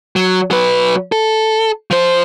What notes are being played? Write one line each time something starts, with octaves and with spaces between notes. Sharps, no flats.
F#3
F#3 B4
A4
F3 C5